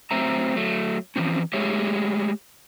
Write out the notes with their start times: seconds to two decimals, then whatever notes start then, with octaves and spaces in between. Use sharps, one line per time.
0.11 F#3 A3 C4 E5 A#5
0.56 F#3 A3
1.16 E3 F3 C4 C#4
1.53 G#3 A3 G4 G#4 C#5 E5